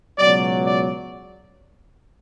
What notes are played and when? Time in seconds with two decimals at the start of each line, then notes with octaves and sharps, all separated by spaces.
0.19 C#2 B2 F#3 D5
0.66 D5